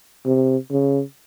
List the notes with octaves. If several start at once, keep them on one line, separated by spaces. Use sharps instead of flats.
C3
C#3